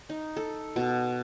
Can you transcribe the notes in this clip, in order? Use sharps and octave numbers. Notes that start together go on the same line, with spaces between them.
D#4
A4
B2